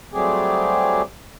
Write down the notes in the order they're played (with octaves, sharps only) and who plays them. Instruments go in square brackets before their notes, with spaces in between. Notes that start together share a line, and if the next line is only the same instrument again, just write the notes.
[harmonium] F#3 G3 A3 C4 G4 G#4